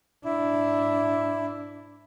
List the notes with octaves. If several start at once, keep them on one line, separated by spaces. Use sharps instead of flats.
G#2 D4 E4